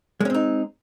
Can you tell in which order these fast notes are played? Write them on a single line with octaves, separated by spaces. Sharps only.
G#3 C#4 C4 D#4